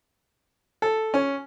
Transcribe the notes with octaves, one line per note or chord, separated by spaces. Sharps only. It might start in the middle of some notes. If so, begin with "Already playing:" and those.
A4
C#4